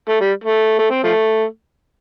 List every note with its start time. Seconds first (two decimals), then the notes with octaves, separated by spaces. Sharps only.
0.09 A3
0.21 G3
0.44 A3
0.79 A3
0.91 C4
1.04 F3 A3